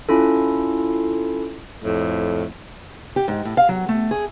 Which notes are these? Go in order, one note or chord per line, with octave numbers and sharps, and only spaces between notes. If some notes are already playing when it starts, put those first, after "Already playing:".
C#4 E4 F4 A4
F2 A2
G4
G#2
A2
F5
F#3
A3
G#4